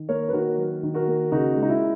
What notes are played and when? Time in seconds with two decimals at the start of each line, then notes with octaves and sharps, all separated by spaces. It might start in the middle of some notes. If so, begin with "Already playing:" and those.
Already playing: D#3
0.09 A#3 A#4 C#5
0.29 B4
0.33 D#3 F#4 A#4
0.58 F#3
0.83 D#3
0.94 F#4 A#4
1.08 A#3
1.32 C#3 D#4 F#4
1.56 G#3
1.62 D#4
1.69 E4